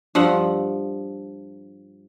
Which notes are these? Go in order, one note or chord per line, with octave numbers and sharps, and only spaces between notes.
G2 F3 F#5